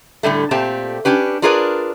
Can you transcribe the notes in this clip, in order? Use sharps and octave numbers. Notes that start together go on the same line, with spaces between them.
A2 D3 G3 A3
A#2 A3 C4 G4 A5
C#4 D4 G4 B4
D4 F4 G#4 A#4 B4 D5